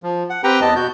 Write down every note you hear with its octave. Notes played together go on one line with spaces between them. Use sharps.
F3
F#5
C4 G4 B4 G5 A#5
E2 B3 D#5 A5
B2 F#4 G6